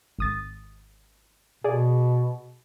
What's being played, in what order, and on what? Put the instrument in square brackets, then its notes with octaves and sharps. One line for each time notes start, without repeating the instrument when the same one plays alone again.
[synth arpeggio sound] G#1 D#6 A6
[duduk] B2 [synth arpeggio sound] G#4 D5